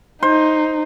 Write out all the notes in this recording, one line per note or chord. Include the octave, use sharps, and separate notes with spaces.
D#4 C5